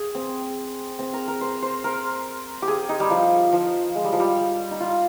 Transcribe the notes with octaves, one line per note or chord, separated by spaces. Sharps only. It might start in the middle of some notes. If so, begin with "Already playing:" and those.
Already playing: G#4
C4
C4
A#4
A#4
C5
C5
A#4
G4
G#4
D#4
G3
F3
F3
G#3
G3
F3
G3
D#4
F4